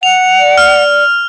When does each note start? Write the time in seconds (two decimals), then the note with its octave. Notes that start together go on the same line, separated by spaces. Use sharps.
0.03 F#5 F7
0.39 D5
0.58 F6